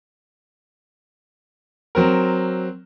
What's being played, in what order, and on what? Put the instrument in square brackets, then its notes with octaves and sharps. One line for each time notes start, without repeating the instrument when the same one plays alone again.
[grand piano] F#3 C4 A#4